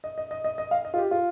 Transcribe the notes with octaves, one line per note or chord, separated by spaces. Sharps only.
D#5
D#5
D#5
D#5
D#5
F5
D#5
F4
G4
F4